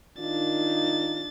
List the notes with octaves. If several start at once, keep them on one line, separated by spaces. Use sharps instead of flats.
D#3 D4 D#4 F4 A6